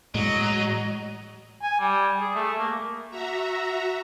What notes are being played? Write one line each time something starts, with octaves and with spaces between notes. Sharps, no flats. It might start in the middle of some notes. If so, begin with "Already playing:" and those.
A2 F#3 G#3 D#5
G#5
G3
G#4
A3
A#3
F#4 E5 A#5